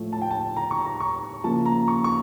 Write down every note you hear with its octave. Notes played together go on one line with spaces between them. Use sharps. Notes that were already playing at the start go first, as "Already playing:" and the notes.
Already playing: A2 F3 A3
A5
G5
A5
A#5
C#6
A#5
C#6
C#3 F3 A#3 A5
A#5
C#6
C#6